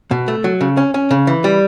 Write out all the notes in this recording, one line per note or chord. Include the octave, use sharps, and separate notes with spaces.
B2
A3
F#3
C#3
C#4
C#4
C#3
E3
G3